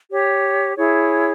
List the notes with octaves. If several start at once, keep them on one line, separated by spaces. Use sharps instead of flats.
G4 C#5
E4 G#4 C#5